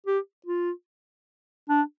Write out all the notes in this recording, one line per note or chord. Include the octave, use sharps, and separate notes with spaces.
G4
F4
D4